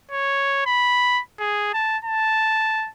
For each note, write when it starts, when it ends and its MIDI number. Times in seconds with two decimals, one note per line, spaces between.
0.11 0.63 73
0.66 1.21 83
1.40 1.71 68
1.74 1.98 81
2.05 2.89 81